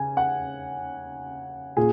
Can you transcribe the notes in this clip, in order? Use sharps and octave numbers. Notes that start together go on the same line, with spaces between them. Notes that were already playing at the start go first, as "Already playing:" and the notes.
Already playing: C#3 G#5
F#5
A#2 G#4